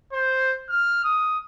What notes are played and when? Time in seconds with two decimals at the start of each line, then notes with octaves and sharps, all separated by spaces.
0.13 C5
0.69 F6
1.04 D#6